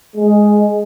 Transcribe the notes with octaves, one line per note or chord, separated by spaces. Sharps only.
G#3